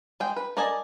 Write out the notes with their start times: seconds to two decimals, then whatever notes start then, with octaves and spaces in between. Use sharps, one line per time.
0.20 G#3 G5
0.36 B4
0.57 A#4 D5 D#5 G#5 A5